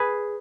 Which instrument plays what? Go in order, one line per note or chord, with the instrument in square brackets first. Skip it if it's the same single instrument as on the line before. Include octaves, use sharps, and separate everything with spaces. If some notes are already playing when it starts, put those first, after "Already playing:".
Already playing: [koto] G#4 B4